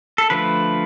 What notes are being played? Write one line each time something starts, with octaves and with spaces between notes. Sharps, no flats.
A4
D3 F3 A3 B4